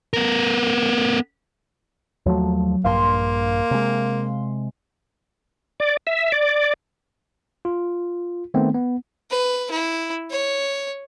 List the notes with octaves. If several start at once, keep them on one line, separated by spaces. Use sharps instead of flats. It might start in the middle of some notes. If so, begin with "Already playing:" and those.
B3 A#4
D#2 F3 F#3 A3
A#1 G2 A#3 F5 C6
C3 G#3
D5
E5
D5
F4
D#3 A3 B3 C4
B3
B4
E4
C#5